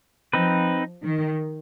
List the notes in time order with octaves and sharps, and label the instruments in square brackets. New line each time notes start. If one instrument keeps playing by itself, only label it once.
[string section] F3 [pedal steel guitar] C4 D#4 B4
[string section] D#3